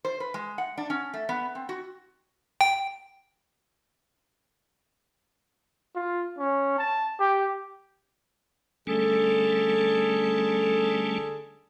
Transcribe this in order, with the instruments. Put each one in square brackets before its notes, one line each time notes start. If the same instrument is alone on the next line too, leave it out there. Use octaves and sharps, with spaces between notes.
[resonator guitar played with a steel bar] C5
B4
G#3
F#5
D4
C#4
A3
B3
C4
F#4
[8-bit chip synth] G5
[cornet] F4
C#4
A5
G4
[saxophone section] D3 G#4 A4 [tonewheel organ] G3 A3 C#4